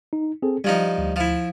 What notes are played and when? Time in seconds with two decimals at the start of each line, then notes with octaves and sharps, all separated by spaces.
0.13 D#4
0.42 C4 G#4 A4
0.64 G2 F3 G3 D#4
0.98 D2
1.16 F3 E4